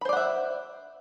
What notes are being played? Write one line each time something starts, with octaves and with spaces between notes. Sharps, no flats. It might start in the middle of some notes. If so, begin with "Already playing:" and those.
C5 D5 E5 F#5 B5